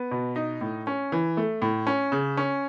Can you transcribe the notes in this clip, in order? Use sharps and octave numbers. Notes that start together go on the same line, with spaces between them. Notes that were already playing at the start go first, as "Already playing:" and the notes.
Already playing: B3
B2
D#4
A2
C#4
E3
A3
A2
C#4
C#3
C#4